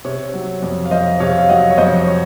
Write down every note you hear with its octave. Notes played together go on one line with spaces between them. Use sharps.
C3 C#5
F#3
F2
F5
F2 C5 D#5
C3 C#5 F5
F5
F#3 D#5 F#5
C#5
F2 C5 D#5
C#5